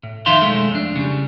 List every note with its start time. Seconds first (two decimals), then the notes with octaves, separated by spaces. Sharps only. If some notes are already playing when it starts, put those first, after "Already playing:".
0.03 A2
0.26 F2 D#3 D#4 E5 F5 C6
0.42 B1 G#2 G#3 A3
0.71 F2 D4
0.96 C#3 G3